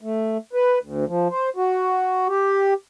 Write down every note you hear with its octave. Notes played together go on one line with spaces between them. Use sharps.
A3
B4
D2
F3
C5
F#4
G4